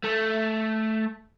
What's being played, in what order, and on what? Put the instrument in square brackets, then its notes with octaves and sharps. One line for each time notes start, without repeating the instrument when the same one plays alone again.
[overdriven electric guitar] A3